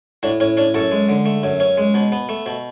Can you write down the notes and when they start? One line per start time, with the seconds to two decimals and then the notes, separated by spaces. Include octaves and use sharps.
0.23 A2 D4 F#4
0.40 A2 C#4
0.57 C#4 D4
0.74 F#2 F#4 A4
0.92 G#3
1.09 D3
1.25 A3
1.43 F#2
1.60 C#4
1.78 G#3
1.94 B2
2.12 B3
2.29 A3
2.46 B2